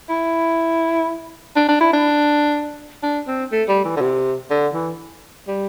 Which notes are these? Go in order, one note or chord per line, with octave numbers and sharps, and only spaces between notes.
E4
D4
D4
E4
D4
D4
C4
A3
G3
E3
D3
C3
D3
E3
G3